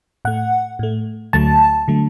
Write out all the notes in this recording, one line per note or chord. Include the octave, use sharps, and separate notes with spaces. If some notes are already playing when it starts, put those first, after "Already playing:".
A2 A3 F#5
A2 A3
D2 D3 F#3 A3 A5
D3 F#3 A3